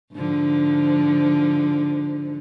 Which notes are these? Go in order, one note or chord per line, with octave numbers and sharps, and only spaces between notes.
G#2 D3 F3